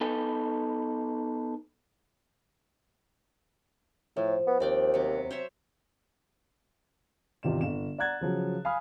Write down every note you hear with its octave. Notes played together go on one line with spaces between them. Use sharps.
B3 D#4 A4 B4 G#5
A2 F3
B3
D#2 C4 D5 G5
C3 F#3 B3
C5 C#5 E5
G#1 E2 C3 F4 D5 E7
G1 E7
D5 F#5 A#5 F#6 G#6 A6
C#3 F3 F#3
F5 G#5 B5 D#6 F6